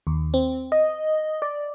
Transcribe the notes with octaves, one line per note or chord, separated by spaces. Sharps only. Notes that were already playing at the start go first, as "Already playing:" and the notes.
D#2
C4
D#5
D5